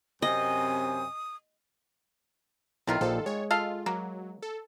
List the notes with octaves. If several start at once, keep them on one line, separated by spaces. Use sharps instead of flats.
F#2 C3 C4 D#5 G#5 D#6
B1 C3 D#3 E4 F4
A#1 F3 A4
G#3 C#5
F4 A4 D#5 F5
F#3 A#3
A4